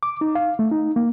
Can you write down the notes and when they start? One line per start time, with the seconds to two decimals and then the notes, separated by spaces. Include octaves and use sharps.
0.03 D6
0.21 D#4
0.35 F5
0.59 A3
0.71 D#4
0.96 A#3